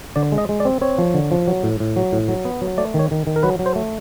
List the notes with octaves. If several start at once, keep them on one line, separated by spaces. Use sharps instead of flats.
D3 D5
G#3
D#5
G#3
D5
C4
C4 C#5
F3
D3
F3
F#3
A2
A2
F#3
A2
F#3
B3
F#3
A3 D5
D#3 C#5
D#3
D#3
A#4
F#3 B4
F#3
C5
A3